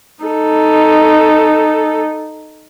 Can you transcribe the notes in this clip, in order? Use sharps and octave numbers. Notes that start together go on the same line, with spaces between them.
D#4 A4